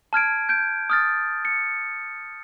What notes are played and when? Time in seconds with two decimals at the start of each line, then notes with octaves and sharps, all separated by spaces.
0.13 A5 F6 G#6 D7
0.49 G6 D7
0.90 D#6 F6 A6
1.45 C#7